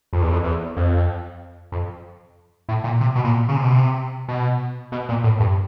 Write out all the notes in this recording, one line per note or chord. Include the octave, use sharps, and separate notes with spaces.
F2
E2
F2
E2
F2
F2
A2
A#2
C3
B2
A#2
C#3
C3
B2
C3
B2
B2
A#2
A2
G2